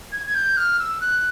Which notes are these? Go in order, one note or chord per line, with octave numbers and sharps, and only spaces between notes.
G#6
G#6
G6
F6
E6
F#6